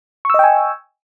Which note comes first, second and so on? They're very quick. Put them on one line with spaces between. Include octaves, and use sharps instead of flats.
C#6 E6 D#5 G5 G#5